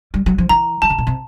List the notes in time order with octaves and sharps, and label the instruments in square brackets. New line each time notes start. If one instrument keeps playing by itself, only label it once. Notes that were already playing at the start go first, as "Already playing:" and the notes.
[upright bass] G3
F#3
F3
[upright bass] E3 [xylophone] A#5
[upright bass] F3 [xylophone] A5
[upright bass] C#3
B2
C3